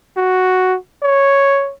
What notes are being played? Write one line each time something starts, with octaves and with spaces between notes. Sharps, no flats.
F#4
C#5